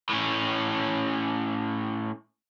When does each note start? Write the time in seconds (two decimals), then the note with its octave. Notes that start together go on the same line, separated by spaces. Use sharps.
0.09 A2 C#4